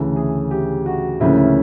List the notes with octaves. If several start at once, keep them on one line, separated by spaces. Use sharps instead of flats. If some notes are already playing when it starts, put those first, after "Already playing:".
Already playing: D2 C#3 E3 A4
G#4
G4
F#4
D2 C#3 F3 A#3 C#4 E4
E4